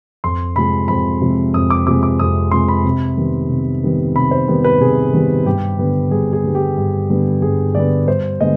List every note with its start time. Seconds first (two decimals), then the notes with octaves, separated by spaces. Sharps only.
0.24 F2 C6
0.56 C3 F3 G#3 B5
0.88 F2 B5
1.21 C3 F3 G#3
1.54 F2 D#6
1.70 D6
1.87 C3 F3 G#3 D6
2.03 D6
2.19 F2 D#6
2.51 C3 F3 G#3 C6
2.68 B5
2.84 C3
3.17 D#3 G3 B3
3.49 C3
3.83 D#3 G3 B3
4.15 C3 B5
4.31 C5
4.48 D#3 G3 B3
4.64 B4
4.81 C3 G#4
5.13 D#3 G3 B3
5.46 G2 G4
5.79 D3 G3 B3
6.11 G2 G#4
6.33 G#4
6.44 D3 G3 B3
6.55 G4
6.77 G2
7.09 D3 G3 B3
7.42 G2 G#4
7.75 D3 G3 B3 D5
8.07 G2 C5
8.40 D3 G#3 B3 D#5